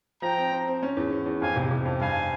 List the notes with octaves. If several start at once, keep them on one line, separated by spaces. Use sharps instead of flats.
F3 G5 A#5
C4
C4
C4
C#4
E2
E2
E2
F2 F5 G#5
C3
C3
F2
G2 F5 G#5